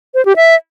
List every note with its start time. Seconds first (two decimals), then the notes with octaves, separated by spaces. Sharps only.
0.14 C5
0.25 G4
0.36 E5